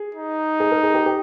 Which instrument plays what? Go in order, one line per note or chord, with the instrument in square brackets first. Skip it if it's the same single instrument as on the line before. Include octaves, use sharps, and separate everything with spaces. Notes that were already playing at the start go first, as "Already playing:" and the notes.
Already playing: [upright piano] G#4
[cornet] D#4
[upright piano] G#4
A#4
G#4
G4
G4